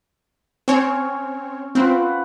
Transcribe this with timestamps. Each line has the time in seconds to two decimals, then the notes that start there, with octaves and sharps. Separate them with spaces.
0.68 C4 C#4 C#5
1.75 C4 F4 B4 F#5